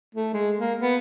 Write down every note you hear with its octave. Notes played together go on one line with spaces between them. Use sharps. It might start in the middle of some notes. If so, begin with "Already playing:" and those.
A3
G#3
A#3
B3